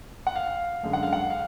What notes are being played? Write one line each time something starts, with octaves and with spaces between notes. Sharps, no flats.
F#5
F5
F#2 D3 G#3
F#5
F5
F#5
F5